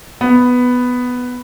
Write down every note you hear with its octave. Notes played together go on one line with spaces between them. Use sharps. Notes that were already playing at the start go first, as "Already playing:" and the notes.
B3